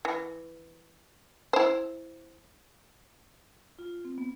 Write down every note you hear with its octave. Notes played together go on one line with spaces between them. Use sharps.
E3
E4 C5
F4
C4
B3